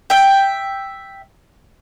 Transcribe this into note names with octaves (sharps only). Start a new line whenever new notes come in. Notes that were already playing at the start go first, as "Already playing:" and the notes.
E5 G5